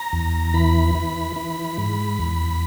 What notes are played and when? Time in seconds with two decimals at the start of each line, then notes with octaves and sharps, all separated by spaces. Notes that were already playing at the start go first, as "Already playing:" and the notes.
Already playing: A#5
0.13 E2
0.54 E3 B5
0.95 E3
1.36 E3
1.78 G#2
2.19 E2